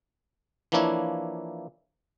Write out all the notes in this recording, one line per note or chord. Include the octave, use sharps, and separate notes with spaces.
E3 F3 A#3 D4 E4 C#5